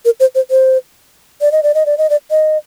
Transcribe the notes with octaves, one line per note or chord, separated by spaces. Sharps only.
A#4
C5
C5
C5
D5
D#5
D5
D#5
D5
D#5
D5
D#5